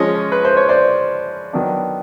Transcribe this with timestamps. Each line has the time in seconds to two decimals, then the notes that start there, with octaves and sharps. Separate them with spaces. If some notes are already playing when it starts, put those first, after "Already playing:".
Already playing: F3 G#3 C#4 C#5 D#5
0.32 B4
0.45 C5
0.57 C#5
0.69 C5 D5
1.53 D#3 F#3 B3 D4